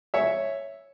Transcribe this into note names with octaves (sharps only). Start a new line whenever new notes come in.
C#5 E5